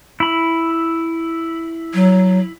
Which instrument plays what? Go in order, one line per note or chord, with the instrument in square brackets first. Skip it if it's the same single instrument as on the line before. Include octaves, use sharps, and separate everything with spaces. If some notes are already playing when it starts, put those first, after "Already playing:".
[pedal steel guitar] E4 B5
[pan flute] F#3